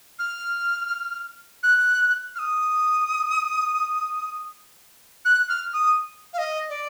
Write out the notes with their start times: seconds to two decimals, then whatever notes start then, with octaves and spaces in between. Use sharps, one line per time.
0.19 F6
1.63 F#6
2.35 F6
2.39 D#6
5.25 F#6
5.49 F6
5.73 D#6
6.33 F5
6.38 D#5
6.69 D5